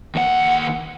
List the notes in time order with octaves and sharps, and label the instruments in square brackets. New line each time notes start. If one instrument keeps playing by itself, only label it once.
[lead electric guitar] D#2 F#5